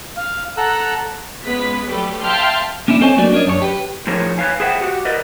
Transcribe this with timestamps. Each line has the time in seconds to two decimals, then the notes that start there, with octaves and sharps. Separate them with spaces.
0.17 F5
0.57 A4 F#5 A#5 E6 F#6
1.43 C#2 G#3 B3 B4 B6
1.89 F#3 G3 A3 G4 B4
2.22 E5 F5 G5 A5 C6 F6
2.88 A#3 C#4 D4 E4
3.01 C4 A4 C5 C#5 D#5 G#5
3.17 F#3 A3 A#3 D4 F#4 D5
3.32 C#4 D4 A#4 C#5 D#5
3.46 F#2 D4 F#4 C#5
3.62 G4 B4
4.07 A2 F3 D#4 G#4 A#4 C#5
4.38 B4 C#5 F5 G#5
4.60 G#4 B4 C5 E5 F#5 G5
4.81 F#4 G4 F#5
5.05 A#4 B4 D5 D#5